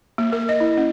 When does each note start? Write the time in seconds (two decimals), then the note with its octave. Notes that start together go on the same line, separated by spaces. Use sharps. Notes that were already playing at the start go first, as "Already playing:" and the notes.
0.18 A#3
0.32 A#4
0.49 D#5
0.60 E4
0.77 C#4